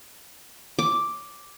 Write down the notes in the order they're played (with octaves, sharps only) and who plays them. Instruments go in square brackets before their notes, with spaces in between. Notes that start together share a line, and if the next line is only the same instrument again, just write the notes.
[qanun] D6